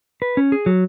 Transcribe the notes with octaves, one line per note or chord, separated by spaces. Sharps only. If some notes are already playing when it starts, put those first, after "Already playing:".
B4
C#4
G#4
F#3